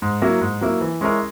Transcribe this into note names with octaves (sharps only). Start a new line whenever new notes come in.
G#2
F#3 A#3 E4
G#2
F#3 A#3 E4
E3
G#3 C#4 E4 A#4